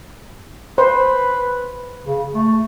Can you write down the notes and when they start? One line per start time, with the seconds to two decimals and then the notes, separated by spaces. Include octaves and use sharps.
0.78 B4 C5
2.05 C#3
2.35 A3